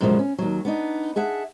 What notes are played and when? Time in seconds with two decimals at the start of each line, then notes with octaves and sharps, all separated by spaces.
0.01 F#2 B2 D3 F3 G#3
0.19 C#4
0.38 D#2 F#3
0.65 B3 D4 D#4
1.16 G#4 E5 F#5 A5